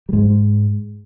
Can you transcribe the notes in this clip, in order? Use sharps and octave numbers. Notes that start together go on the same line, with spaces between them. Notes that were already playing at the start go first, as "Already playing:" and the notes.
G3
G#2 G#3